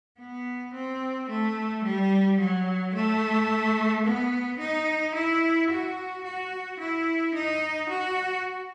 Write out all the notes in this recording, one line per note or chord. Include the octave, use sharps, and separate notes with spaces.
B3
C4
A3
G3
F#3
A3
B3
D#4
E4
F#4
F#4
E4
D#4
F#4